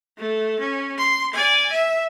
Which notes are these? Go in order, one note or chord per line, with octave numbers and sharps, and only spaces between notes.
A3 A4
C#4
C6
D5 G#5
E5